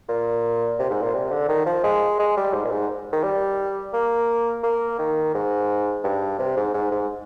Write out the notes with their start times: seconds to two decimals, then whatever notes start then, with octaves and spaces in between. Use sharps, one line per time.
0.09 A#2
0.79 C3
0.90 G#2
1.02 A#2
1.14 C3
1.31 D3
1.48 D#3
1.66 F3
1.84 G#3
2.19 G#3
2.37 G3
2.53 G#2
2.65 A#2
2.71 G#2
3.12 D#3
3.23 G3
3.94 A#3
4.63 A#3
4.99 D#3
5.34 G#2
6.04 G2
6.39 C3
6.57 G#2
6.74 G#2
6.92 G#2